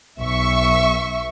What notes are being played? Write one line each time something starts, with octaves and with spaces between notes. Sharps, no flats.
B1 E5 C#6